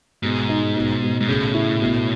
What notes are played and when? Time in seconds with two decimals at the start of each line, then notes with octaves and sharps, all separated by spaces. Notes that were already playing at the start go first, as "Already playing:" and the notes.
0.23 G#2 B2
0.49 D#4
0.76 B2
1.02 B2
1.20 G#2
1.28 A2 C#3
1.54 E4
1.81 B2